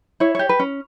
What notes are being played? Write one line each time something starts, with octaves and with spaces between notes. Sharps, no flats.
E4 C#5
G4 C#5
B4
C#4